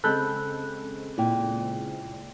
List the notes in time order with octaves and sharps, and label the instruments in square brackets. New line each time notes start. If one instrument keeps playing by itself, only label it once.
[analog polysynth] C#3 G#3 C4 [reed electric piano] A4 B5 G6 [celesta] F#6
[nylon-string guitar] A#2 [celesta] E4 G5